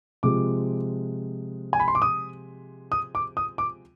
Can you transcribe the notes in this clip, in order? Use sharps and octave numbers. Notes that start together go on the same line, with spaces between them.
C3 F3 G#3 D6
G#5
B5
C6
D6
D#6
D#6
D6
D#6
D6